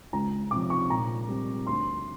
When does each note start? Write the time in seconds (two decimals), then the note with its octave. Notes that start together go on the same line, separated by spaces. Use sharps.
0.13 C#2 A#5
0.51 C3 F3 D6
0.70 C#6
0.90 A#2 A#5
1.29 G3 C4
1.67 D2 C6